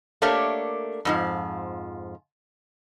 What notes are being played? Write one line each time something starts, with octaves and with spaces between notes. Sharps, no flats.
A3 A#3 D4 G4 A#4 C#5
F2 G#2 F3